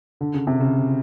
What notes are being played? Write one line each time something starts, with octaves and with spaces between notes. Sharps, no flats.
D3
C#3
C3
C#3